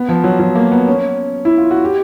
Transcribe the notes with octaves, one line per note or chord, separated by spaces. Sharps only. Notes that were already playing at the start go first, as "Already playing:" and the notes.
Already playing: B3
F3
F#3
F#3
A#3
B3
C#4
E4
F4
F#4
G4